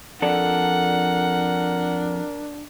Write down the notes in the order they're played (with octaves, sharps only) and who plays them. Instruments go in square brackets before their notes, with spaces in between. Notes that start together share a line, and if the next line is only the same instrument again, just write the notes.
[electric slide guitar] F2 A4 D5 [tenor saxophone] D4 [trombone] A#4 [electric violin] F#5